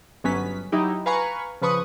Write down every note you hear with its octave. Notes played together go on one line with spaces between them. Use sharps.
G1 F#3 B3 C#4 B4 B6
F#3 D#4 E4 G4
B4 F5 G#5 A#5 B5 C#6
C#3 F3 B4 C#6 D#6